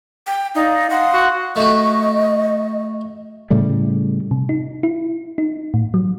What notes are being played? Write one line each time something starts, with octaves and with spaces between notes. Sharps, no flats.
G5
D#4 D5 F5
F5 F#5 C6 D#6
F#4
A3 F#4 D#5
A2 C#3 G3 A3
C3
D#4
E4
D#4
A2
F#3